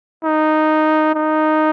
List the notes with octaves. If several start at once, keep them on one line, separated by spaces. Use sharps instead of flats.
D#4
D#4